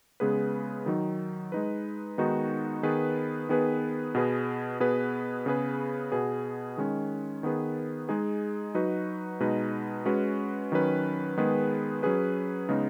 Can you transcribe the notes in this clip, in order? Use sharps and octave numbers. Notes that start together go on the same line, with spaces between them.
C#3 G#3 B3 G#4 B4
D#3 F#3 D#4
G#3 D#4 B4
D#3 G#3 B3 D#4 F#4
D#3 B3 G#4 B4
D#3 B3 G#4 B4
B2 B3 G#4 B4
B2 B3 G#4 B4
C#3 B3 G#4 B4
B2 B3 G#4
D#3 G#3 C#4
D#3 B3 G#4 B4
G#3 D#4 G#4
F#3 D#4 F#4 B4
B2 G#3 D#4 B4
G#3 C#4 F#4 B4
D#3 F#3 C#4 B4
D#3 G#3 B3 G#4 B4
F#3 C#4 G#4 B4
C#3 G#3 B3 D#4